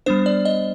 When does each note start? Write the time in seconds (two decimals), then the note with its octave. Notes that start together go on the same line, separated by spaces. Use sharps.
0.06 G3 B3 D4 C5
0.26 D5
0.45 D#5